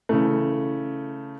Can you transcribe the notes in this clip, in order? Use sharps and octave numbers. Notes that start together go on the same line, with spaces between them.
C#3 E3 A3